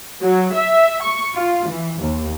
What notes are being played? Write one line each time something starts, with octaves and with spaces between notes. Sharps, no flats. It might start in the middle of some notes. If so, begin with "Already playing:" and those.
F#3
E5
C#6
F4
E3
D#2